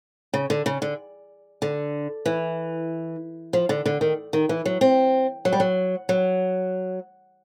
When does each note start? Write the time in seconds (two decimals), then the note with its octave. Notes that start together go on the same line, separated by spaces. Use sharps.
0.34 C#3
0.50 D3
0.66 C#3
0.82 D3
1.62 D3
2.26 E3
3.53 F3
3.69 D3
3.86 D3
4.01 D#3
4.33 D#3
4.49 E3
4.65 F#3
4.81 C4
5.45 F#3
5.53 G3
5.60 F#3
6.09 F#3